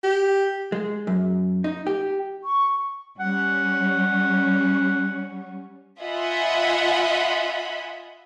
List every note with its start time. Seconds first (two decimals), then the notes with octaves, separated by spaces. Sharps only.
0.04 G4
0.72 G#3
1.07 F#2
1.64 D#4
1.87 G4
2.43 C#6
3.20 G3 C#4 F#5
6.01 F4 D#5 E5 F#5 G#5 B5